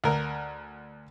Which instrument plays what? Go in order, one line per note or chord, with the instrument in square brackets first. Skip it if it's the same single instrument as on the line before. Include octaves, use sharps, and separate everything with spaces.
[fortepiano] D2 A#4